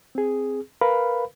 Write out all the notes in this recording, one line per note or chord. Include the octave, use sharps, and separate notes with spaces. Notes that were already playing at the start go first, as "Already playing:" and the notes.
C4 G#4
A#4 B4 F5 B5